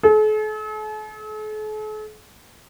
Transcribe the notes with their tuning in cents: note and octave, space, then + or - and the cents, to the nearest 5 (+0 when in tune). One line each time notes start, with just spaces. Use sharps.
A4 -45